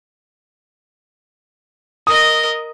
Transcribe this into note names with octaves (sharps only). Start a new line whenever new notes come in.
A#4 D#5 D#6